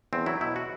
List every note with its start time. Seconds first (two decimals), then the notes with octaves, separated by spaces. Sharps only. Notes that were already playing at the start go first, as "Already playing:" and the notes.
0.13 E2 C4
0.26 F#3 E4
0.41 B2 E4
0.56 F#4